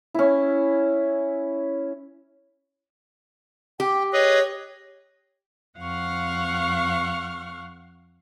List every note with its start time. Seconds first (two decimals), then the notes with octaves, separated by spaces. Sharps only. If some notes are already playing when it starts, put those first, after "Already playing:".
0.14 C#4 E4
3.80 G4 G5
4.13 G#4 B4 C#5 D#5
5.79 F2 F5 F#5 C#6 F6